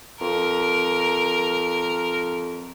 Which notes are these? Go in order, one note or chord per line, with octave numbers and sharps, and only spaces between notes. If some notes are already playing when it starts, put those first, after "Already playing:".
F2 A#4